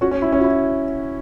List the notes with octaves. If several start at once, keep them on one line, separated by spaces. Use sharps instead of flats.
C#4 F#4
C#4
E4
C#4
F#4
E4